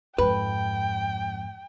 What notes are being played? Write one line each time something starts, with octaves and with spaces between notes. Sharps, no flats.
F2 G#2 B4 G5